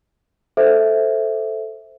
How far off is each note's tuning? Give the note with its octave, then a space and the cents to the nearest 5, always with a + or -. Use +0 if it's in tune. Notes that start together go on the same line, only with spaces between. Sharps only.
A4 +0 C5 +0 E5 +0